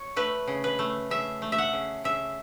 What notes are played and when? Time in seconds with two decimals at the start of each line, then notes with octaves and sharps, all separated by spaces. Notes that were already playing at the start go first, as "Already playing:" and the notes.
Already playing: C#5
0.16 A3 B4
0.47 C#3
0.64 B4
0.79 A3
1.11 C#3 E5
1.42 A3
1.52 E5
1.58 F#5
1.73 C#3
2.04 C#3 E5